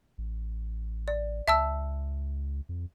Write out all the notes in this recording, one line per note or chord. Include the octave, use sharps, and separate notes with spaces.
A1
D5
C#2 E5 A5 E6
F2